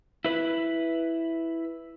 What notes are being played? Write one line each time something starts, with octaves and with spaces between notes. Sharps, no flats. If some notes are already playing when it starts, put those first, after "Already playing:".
E4 B4